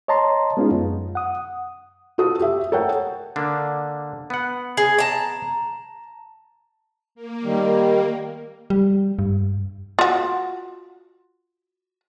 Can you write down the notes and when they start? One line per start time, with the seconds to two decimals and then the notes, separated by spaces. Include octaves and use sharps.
0.08 C#5 D#5 A5 A#5 C6
0.57 G#3 B3 C#4 D#4 F4 G#4
0.71 F#2
1.15 F#5 D#6
2.18 F4 F#4 A4 D#6
2.40 G4 E5
2.72 A4 A#4 C#5 F#5 G5
3.36 D3 A#3 D4
4.30 B3 F#5
4.77 G#4
4.99 A5 A#5
7.15 A#3
7.44 D#3 G3
8.70 G3
9.19 G2
9.99 F4 F#4